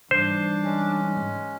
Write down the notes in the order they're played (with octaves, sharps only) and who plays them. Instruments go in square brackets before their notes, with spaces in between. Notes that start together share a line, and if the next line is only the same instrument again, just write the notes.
[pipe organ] G#2 E3 G3 [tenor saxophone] D4 [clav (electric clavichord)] C5
[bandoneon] G#3 C#4